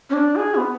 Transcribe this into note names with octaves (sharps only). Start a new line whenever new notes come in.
C#4
D4
G#4
B3